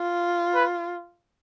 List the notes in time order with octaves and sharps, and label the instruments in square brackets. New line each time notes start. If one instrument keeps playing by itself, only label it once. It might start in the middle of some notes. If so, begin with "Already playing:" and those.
Already playing: [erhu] F4
[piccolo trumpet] B4